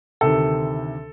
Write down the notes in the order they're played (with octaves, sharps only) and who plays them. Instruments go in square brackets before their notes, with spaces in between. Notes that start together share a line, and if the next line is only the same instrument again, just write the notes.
[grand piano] D2 C3 D#3 A4